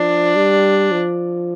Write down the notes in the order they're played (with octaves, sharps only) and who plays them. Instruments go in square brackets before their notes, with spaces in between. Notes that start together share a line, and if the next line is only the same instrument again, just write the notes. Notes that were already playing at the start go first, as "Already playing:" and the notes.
Already playing: [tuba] F3 [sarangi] D4
[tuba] G3
F3